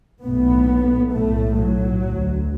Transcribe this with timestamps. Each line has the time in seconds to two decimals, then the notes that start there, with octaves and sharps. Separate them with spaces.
0.24 B1 A2 B3
1.14 B1 A2 A3
1.59 F#3
2.03 D2